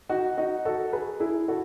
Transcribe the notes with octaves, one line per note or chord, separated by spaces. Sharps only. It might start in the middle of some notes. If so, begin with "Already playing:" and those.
D#4 F#4
D#4 F#4
F#4 A4
G#4 B4
E4 G#4
F#4 A4